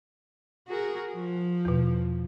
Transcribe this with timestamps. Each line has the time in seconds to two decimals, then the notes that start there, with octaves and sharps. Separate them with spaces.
0.67 F#4 G#4 A#4
1.14 F3
1.65 E2 B2